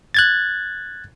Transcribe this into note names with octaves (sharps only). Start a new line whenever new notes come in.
F#6 G#6 A6